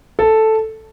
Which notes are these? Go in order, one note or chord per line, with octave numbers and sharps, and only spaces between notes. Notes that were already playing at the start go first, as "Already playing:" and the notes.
A4